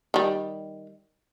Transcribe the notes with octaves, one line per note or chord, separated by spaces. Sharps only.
D#3 G3